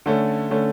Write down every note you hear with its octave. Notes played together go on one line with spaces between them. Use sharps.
D3 A3 C#4
D3 A3 C#4